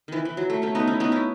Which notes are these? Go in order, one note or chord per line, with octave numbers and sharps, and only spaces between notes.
D#3 E3
E3
F#3
A3
A3 C#4
B3 D#4
C#4 E4
B3 D#4
C#4 E4